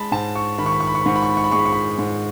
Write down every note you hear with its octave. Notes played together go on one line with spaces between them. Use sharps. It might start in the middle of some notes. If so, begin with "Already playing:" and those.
Already playing: G#3 A5 B5
G#2 A5
C#6
D#3 B5
C#6
B5
C#6
B5
C#6
B5
G#2 C#6
B5
C#6
B5
C#6
B5
G#3 C#6
B5
C#6
B5
G#2